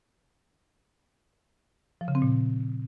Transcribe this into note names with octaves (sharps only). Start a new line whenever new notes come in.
F3
C#3
C4
A#2